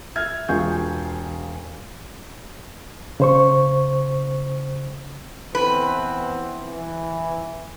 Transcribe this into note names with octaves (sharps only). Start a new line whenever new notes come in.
E5 F6 G#6
E1 F4 G#4 C#6 G6
C#3 C5 C#6
E3 B3 C4 B4
E3